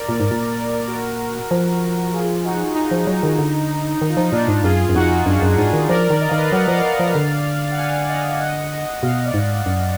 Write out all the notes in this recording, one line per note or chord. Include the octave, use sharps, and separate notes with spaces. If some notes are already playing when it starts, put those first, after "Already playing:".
Already playing: A#4 D5
A#2
G#2
A#2
F#4 A#4
F3
F4 G#4
D#4 F#4
D#4
F3
F#3
D#3
D3
D#3 D#4
F4
F3 D#4
A#2 D4 F4
G#2
F#2 F4 G#4
F#2
F2 D#4 F#4
F#2 D4 F4
F#2 F#4
G#2 F4 G#4
D#3
F3 A#4 D5
D#3
D#5
D#3 F5
B4 D#5
F#3 F#5
F5
F3 D#5
D5 F5
F3
D3
F#5
F5 G#5
D#5 F#5
D#5 F#5
B2 F5
D#5
D5 F5
G#2
F#2